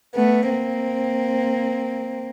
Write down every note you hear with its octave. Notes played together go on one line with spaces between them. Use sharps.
A3 B3
A#3 C4